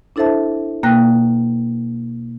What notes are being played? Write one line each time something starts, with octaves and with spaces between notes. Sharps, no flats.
D4 E4 A4 C5 E5 A5
B2 A#3 G5 F#6 A#6